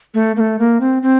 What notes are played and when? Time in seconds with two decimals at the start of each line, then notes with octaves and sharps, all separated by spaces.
0.14 A3
0.36 A#3
0.40 A3
0.59 A#3
0.81 C4
1.03 C4